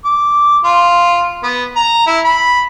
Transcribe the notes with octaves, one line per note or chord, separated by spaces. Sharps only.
D6
F4
B3
A#5
E4
B5